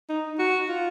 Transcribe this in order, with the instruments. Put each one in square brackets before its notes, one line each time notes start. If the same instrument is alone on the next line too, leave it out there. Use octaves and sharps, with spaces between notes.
[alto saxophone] D#4
F#4
F4